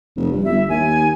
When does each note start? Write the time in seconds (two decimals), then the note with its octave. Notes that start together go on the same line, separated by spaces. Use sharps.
0.16 F1
0.32 G2
0.44 G1 E5
0.69 D#2 G#5